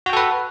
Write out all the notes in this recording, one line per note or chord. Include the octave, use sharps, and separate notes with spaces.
F#4 A4 B4 G5